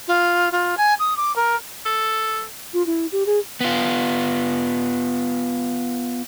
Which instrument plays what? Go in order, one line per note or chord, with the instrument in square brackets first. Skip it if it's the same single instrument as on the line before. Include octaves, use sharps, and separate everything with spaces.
[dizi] F4
F4
G#5
D#6
D6
A#4
[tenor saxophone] A4
[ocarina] F4
E4
G4
G#4
[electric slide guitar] B3 F4